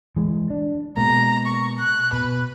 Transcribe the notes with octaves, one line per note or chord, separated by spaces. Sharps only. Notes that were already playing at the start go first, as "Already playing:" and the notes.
E3 G#3
D4
B2 G#3 A#3 A#5
C#6
F#6
B2 B4